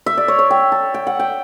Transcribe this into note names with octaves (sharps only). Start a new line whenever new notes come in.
E5
D5
C#5
C#5
G5
A5
G5
F#5
G5